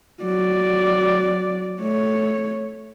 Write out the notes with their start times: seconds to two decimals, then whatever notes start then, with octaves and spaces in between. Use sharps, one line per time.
0.22 F#3 D5
1.81 A3 C#5